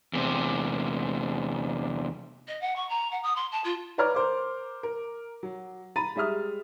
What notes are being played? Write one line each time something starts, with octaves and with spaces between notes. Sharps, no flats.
E2 C3
D#5
F#5
C#6
A#5
F#5
D#6
C6
A5
F4
B4 C#5 D5 A#5 D6 F6
A#4 C5 D6
A#4
F#3
A#5 B5 A6 D#7
G3 G#3 E5 D#6 F6